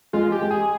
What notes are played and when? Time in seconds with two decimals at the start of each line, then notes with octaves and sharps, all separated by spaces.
0.13 G#3 F4
0.32 G4
0.42 G#3
0.51 G#4